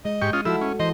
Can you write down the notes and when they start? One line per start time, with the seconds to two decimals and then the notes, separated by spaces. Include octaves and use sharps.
0.05 G#3 D#5
0.22 G#2 G4 C#6
0.33 C#4 F4 D#5
0.45 F3 E4 F#4 A4 E6
0.61 C#4
0.80 E3 C5 D#5